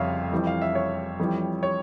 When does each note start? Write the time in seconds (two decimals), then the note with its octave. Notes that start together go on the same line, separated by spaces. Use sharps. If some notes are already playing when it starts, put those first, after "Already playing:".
Already playing: F1 F2 C#3 G3 C#5 E5 F5
0.32 F2 E3 G3
0.47 F5
0.61 E5
0.75 C#5
1.19 F2 E3 G3
1.63 C#5